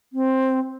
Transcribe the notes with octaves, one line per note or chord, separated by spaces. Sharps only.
C4